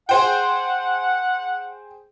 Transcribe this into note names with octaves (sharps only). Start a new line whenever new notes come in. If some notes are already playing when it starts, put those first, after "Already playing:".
G#4 C5 F#5 G5